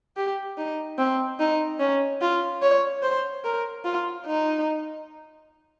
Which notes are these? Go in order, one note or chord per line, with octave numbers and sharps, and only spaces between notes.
G4
D#4
C4
D#4
C#4
F4
C#5
C5
A#4
F4
D#4